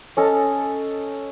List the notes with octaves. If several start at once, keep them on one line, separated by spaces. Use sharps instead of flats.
C#4 A4 D#5 A5